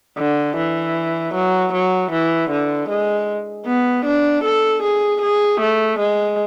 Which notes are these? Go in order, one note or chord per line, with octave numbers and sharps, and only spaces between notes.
D3
E3
F#3
F#3
E3
D3
G#3
B3
D4
A4
G#4
G#4
A3
G#3